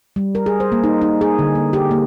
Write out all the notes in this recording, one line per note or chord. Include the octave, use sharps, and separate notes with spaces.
G3
A#4
G#4
C5
A#3
D#4
D#4
G#4
D3
A#3
G4
A#3